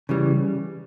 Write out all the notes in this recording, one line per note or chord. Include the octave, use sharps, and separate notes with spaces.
C#3 E3 G3